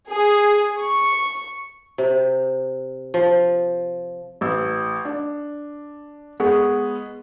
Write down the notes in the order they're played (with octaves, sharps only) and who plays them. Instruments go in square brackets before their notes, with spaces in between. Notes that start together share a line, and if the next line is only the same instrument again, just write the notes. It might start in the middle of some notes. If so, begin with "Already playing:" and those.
[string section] G#4
C#6
[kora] C3
F3
[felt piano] A1 E6
D4
G#3 B3 G#4 C#6